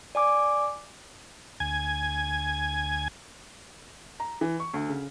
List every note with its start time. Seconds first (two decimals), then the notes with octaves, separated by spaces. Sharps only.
0.15 D5 G#5 D6
1.60 D2 G#5 G#6
4.20 A#5
4.41 E3
4.60 C#6
4.74 D2
4.89 C#3